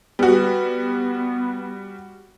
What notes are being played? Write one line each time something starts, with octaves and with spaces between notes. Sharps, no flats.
G3 B3 F#4